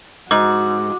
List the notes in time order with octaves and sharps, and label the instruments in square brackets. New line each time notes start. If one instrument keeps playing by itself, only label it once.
[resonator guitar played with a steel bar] G#2 [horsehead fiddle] F#4 [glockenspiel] D6